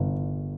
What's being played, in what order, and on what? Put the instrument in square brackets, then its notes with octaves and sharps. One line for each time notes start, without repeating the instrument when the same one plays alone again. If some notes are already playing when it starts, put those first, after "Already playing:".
Already playing: [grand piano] G1 G3